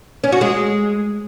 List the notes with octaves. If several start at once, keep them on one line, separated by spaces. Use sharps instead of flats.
C#4
F#4
G#3